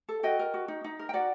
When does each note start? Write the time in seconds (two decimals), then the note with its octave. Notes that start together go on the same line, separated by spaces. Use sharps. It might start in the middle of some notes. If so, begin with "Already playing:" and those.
0.09 A4
0.23 F#4 D#5 G5
0.39 A#4
0.54 F#4
0.68 D#4
0.84 D#4
0.99 A#4
1.09 G5
1.14 F#4 D5 F#5